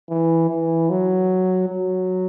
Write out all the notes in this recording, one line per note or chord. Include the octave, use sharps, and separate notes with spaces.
E3
E3
F#3
F#3